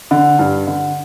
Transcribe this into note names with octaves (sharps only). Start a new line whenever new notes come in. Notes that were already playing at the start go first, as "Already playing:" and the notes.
D3
G2
D3